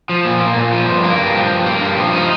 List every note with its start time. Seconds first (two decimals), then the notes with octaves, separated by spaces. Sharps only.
0.09 F3
0.25 A#2
0.40 A#3
0.56 A#2
0.72 F3
0.88 G2
1.04 A#3
1.19 G2
1.35 F3
1.51 G2
1.66 A#3
1.82 G2
1.98 F3
2.13 D#4